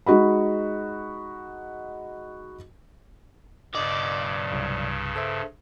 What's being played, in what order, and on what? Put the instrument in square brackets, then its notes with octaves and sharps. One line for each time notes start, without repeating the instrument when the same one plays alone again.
[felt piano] G#3 D#4 F#4 D#5 B5
[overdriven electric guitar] B1 D5 [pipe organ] G2 C#3 [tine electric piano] D#5
[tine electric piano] C2
A4 C5 E5